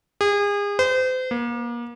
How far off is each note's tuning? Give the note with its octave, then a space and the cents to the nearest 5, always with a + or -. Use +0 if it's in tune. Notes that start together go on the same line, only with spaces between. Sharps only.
G#4 -35
C5 -35
A#3 +35